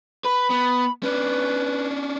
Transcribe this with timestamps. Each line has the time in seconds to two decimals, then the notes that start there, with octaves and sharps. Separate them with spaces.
0.25 B4 B5
0.50 B3
1.03 C#4 D4 B4